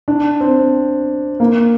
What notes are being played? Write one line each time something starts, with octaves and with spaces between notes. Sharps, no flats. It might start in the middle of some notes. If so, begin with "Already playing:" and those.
D4
C4
A#3